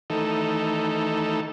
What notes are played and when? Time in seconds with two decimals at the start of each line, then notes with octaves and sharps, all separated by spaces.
0.10 D#3 E3 A3 D#4 A4